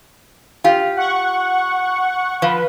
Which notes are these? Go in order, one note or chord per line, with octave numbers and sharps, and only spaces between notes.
F4 G4
F#5 C#6
F3 B4